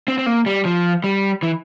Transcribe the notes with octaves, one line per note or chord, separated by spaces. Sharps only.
C4
C4
A#3
G3
F3
G3
E3